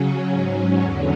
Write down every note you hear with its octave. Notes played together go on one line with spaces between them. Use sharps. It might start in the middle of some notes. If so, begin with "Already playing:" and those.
Already playing: C#3 F#3 C#4
G#2 F#3 C#4
E2 D3 F#3 C#4